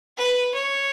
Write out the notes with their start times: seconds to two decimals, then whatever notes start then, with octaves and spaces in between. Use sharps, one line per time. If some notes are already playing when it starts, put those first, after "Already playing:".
0.17 B4
0.54 C#5